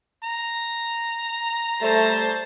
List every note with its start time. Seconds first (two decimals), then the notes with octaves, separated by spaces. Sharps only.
0.24 A#5
1.81 G3 A3 C5 A5